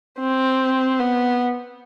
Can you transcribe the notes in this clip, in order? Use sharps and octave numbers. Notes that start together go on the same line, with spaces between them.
C4
B3